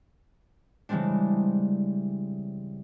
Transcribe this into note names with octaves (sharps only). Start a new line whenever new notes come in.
C#3 E3 G3 G#3 C4 D4